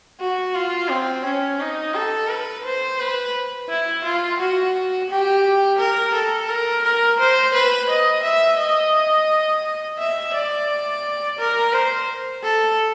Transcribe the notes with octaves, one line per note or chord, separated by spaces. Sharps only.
F#4
F4
C4
C#4
D#4
A4
B4
C5
B4
E4
F4
F#4
G4
A#4
A4
A#4
A#4
C5
B4
D#5
E5
D#5
E5
D5
A#4
C5
A4